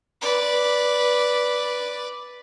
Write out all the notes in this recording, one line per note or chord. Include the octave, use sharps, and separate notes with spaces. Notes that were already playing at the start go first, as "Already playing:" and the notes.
B4 D5